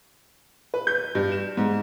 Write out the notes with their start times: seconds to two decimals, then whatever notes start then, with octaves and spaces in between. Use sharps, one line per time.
0.74 B4
0.87 G6
1.15 G2
1.32 E7
1.57 G#2